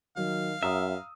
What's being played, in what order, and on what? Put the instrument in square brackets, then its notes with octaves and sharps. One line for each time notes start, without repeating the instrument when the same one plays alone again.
[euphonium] D#3 [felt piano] F#3 [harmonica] F5
[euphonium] F#2 [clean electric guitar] E5 [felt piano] A#5 D#6 E6